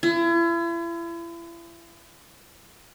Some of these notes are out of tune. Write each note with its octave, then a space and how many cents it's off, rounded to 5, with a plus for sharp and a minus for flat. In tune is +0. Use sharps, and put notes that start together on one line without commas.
E4 +40